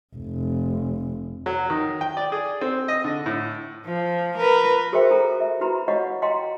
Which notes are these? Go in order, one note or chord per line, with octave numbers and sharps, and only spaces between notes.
F1
F#3
D#3
G5
D5
G#4
C4
D#5
D3
A2
F3
A#4 B4
F#4 G#4 A#4 C5 E5 G5
F4 G#4 A4 A#5
E5
E4 F#4 B4 A#5 B5
F4 C#5 D#5 F5 F#5 C#6
D#5 F5 G5 A#5 C6